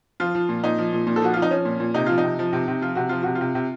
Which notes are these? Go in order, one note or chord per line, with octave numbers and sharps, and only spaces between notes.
F3 F4
F3
A#2
A#2 D#4
F3
A#2
A#2
A4
F3 F#4
F3 F4
D#4
F3 C#4
A#2
A#2
C3 D#4
F3 F4
D#4
C3
F3
C3
C3
F3 F4
C3 F#4
F3 F4
C3 F#4
F4
C3
C3